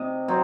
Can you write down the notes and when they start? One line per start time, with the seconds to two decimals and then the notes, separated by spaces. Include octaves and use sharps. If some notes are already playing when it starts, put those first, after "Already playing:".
Already playing: C3 D#5
0.28 F#3 C4